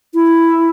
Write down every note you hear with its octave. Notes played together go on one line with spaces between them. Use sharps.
E4